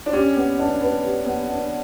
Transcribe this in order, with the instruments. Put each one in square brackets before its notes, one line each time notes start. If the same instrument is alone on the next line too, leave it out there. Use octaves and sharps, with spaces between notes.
[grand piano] D4
[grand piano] C#4 [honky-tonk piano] G4
[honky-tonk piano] B3
D4
B4
G4
B3
D4